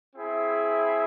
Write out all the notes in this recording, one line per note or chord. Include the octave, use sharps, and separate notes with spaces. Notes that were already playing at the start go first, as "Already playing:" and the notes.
C4 E4 G#4 E5